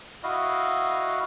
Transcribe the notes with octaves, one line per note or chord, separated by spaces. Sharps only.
E4 F#4 D#5 F5